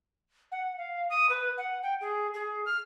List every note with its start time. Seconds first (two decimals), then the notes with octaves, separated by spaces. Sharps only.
0.52 F#5
0.78 F5
1.10 D#6
1.29 B4
1.57 F#5
1.83 G5
2.01 G#4
2.34 G#4
2.66 F6